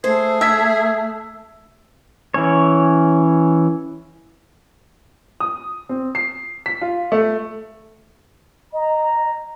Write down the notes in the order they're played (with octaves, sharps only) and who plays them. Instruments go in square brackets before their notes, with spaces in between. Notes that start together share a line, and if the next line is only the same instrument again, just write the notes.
[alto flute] A3 [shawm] G#4 [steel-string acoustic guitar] C5
[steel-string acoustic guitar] E5 [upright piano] E6 G#6 B6
[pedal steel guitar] E3 C#4 C#5
[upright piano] D#6
C4
C7
B6
F4
A3
[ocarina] D#5 [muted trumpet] A#5